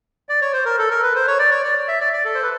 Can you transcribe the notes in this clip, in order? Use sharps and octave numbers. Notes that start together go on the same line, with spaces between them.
D5
C#5
C5
A#4
A4
A#4
B4
C5
C#5
D5
C#5
D5
E5
D5
D5
A4
C5
B4